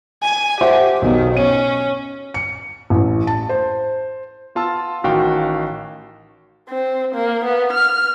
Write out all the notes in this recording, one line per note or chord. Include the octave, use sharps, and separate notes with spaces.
G#5
G4 C5 E5 F#5
B1 B2 D#3
C#4 C#5 D#7
C#7
A1
A5
C5
B3 F4 A5 E6
A1 D#3 F#4 F5 G5
C4
A#3
B3
F6